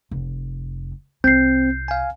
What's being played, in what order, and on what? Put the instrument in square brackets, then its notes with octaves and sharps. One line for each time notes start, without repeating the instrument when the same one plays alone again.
[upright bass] F1
[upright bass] C2 [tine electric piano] C4 [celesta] G6 C7
[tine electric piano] F5 G#5